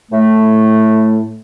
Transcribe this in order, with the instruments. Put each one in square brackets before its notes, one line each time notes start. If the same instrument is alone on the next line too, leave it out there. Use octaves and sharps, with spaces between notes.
[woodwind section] A2 A3